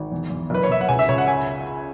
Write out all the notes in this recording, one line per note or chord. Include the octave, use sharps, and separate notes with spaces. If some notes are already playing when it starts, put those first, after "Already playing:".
Already playing: G#1
E2
E2
F#1 B4
C#5
F#1 E5
F#5
C#2 G#5
E5
C#2 C#5
F#5
G#5